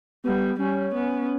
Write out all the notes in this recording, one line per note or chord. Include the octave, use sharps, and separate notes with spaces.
G3 B3
G3 C#4
B3